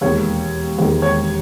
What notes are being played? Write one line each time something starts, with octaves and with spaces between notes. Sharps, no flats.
E1 D#2 D#3 G#3 C#5
E1 D#2 D#3 G#3
C#5